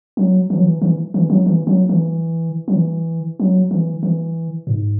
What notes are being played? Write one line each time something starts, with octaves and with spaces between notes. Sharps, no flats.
F#3
E3
F#3
E3
E3
E3
F#3
E3
F#3
E3
F#3
E3
F#3
E3
E3
G#2